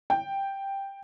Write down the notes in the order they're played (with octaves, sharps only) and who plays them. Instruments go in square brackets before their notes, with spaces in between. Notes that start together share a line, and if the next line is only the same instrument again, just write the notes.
[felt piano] G5